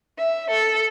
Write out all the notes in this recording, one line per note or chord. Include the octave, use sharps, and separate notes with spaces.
E5
A4